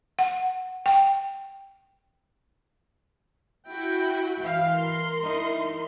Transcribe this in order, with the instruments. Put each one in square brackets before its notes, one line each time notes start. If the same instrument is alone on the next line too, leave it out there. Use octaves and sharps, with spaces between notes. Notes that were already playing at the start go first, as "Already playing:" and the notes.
[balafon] F#5
G5
[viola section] E4 F#4 G5
[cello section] E3 F5
[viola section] A#4 C6
[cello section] E3 D#4 E4